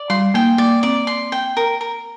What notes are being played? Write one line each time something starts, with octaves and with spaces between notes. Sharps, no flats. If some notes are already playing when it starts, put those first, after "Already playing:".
Already playing: D5
G3 C6
A#3 G5
A#3 D5
C4 D5
C6
G5
A#4
A#4